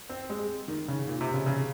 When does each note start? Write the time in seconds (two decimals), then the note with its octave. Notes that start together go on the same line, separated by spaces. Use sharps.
0.09 C4
0.30 G#3
0.68 D#3
0.88 C#3
1.08 A#2
1.21 C3
1.34 C#3
1.46 C#3